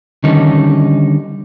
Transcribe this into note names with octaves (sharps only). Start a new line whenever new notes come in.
D3 D#3 G3 C#4 D#4